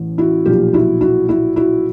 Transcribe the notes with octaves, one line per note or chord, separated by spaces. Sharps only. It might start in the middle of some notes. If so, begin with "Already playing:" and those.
Already playing: A1 A2
E4 F#4
B1 A#2 F3 F4 G4
E4 F#4
E4 F#4
E4 F#4
E4 F#4